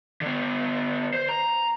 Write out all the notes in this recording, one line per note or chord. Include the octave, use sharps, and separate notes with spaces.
D3 B3
C5
A#5